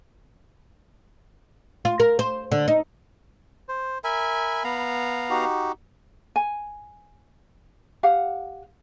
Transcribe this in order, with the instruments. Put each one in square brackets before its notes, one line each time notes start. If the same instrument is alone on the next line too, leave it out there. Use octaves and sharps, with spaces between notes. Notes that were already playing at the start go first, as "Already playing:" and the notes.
[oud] F4
A#4
C5
D3
D#4
[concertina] C5
[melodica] A#4 E5 G#5 [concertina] B5
[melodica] B3 F5 A#5
[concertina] D#4 F#4 G4
[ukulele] G#5
G4 F5 F#5